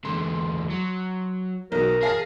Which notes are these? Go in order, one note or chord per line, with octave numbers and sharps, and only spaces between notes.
E2 D3 C6
F#3
B1 B2 A#4
G#4 F5 A5 A#6